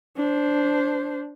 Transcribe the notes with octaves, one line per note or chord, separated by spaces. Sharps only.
D4 C5